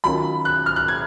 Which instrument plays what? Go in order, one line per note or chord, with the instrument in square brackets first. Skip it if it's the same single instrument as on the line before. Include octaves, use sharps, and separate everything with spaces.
[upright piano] D#3 F#3 C#4 F4 [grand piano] B5
[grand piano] F#6
F6
F#6
G#6